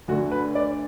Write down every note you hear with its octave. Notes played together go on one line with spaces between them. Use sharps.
D2 D3 F#4
B4
D5